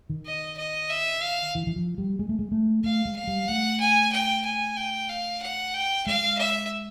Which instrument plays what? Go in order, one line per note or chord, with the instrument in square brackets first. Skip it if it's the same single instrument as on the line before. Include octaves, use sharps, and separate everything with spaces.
[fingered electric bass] D#3
[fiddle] D#5
D#5
E5
F5
[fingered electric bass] E3
E3
F3
G3
G#3
A3
G#3
A3
[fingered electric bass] A3 [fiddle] F5
[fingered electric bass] G#3
[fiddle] F5
[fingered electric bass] G3
[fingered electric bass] A3 [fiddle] F#5
[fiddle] G#5
G5
G#5
G5
F5
F#5
G5
[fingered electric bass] G#3 [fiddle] F5
[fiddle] E5